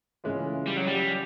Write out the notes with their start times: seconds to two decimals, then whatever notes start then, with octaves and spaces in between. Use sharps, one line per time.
0.24 C#3 E3 G#3 C#4 F4
0.68 G3
0.77 F#3
0.87 G3